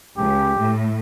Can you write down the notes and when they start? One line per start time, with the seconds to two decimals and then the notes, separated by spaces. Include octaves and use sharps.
0.18 C#2 G4
0.59 A2